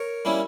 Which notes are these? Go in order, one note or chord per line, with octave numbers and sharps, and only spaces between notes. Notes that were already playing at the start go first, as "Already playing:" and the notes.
Already playing: A#4 C#5
G3 A#3 C#4 E4